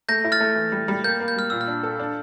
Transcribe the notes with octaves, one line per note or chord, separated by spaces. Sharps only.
A3 G6 A#6
E4
F6 A6
A3
E3
G3
G3
A#3 G6
A#3
G6
G3 F6
A#2 E6
F6
D4
A4
D4